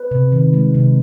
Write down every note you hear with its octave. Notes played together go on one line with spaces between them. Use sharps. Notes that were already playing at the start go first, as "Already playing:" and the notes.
Already playing: B4
C3
D#3
G#3
C3